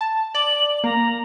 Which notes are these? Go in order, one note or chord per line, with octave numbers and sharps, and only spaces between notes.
A5
D5 F#7
A#3 A#5